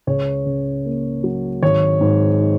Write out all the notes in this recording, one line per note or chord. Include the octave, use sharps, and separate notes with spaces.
C#2 C#5
C#3
A#3
F#3
G#1 C#5
G#2
D#4